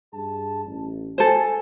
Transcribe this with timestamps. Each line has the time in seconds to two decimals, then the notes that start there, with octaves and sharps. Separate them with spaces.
0.12 G2 G#4 A5
0.64 A1
1.18 A4 C5 G#5